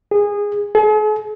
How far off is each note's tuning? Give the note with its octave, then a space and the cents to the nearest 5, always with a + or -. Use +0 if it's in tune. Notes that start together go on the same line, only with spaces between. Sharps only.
G#4 -20
G#4 +45